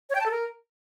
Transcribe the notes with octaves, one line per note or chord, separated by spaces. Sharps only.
C#5
G5
A5
A4
A#4